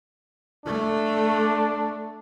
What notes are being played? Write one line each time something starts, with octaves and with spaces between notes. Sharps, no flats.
A3 D4